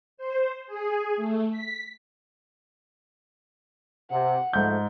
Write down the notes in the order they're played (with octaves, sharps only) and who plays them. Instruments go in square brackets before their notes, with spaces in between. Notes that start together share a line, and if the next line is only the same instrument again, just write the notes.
[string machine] C5
G#4
A3
B6
[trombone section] C3 [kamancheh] F#5
[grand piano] G#2 G6 [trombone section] F3 A3